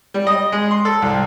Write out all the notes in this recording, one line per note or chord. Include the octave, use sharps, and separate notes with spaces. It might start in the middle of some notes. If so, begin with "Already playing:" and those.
G3
D#5
G#3
C6
A4
C2